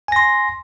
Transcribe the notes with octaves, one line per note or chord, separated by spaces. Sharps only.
G#5 C6 A#6